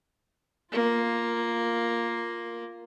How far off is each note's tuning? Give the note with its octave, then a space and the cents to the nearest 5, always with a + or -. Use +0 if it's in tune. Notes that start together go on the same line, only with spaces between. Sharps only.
A#3 +0 F4 +0